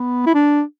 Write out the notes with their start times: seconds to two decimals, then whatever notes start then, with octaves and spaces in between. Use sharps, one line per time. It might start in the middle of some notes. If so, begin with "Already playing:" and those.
Already playing: B3
0.26 E4
0.34 D4